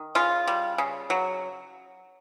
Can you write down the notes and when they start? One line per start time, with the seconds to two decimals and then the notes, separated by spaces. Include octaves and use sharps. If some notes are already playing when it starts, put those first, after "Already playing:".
Already playing: D#3
0.15 C#3 F4
0.47 G3
0.78 C#3
1.10 F#3